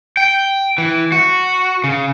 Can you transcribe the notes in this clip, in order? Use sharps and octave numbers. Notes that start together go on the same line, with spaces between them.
G5
E3
F#4
C#3